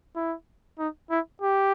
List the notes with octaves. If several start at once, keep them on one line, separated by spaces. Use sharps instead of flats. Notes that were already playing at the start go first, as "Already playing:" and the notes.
E4
D#4
E4
G4